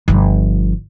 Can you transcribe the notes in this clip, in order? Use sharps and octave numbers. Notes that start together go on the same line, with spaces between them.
G1 F3